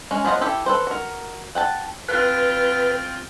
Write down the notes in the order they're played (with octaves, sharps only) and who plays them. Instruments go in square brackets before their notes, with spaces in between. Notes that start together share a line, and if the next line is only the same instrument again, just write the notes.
[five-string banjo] G#3 C#4
F3 F#3 B3 F4 D#5
E4 G4 A4 G5
A4 B4 C5
F#4 A#4
F#5 G5 A5
[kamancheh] C4 F4 [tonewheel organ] B4